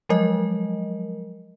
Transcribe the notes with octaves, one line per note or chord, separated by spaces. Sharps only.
F3 F#3 G#3 A#4 D#5